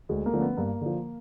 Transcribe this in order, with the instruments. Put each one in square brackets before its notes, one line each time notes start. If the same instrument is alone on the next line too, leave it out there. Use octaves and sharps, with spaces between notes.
[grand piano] D2 [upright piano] G#3
[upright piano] A#3
[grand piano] D3 F3 A3 C#4
[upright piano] B3
[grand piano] G2 [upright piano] A#3
[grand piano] D3 F3